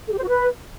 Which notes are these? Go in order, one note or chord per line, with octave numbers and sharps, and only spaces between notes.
A4
G4
C5
F#4
B4